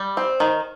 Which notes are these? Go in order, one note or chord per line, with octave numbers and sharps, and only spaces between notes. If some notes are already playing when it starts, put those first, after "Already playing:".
Already playing: G3
C4
D#3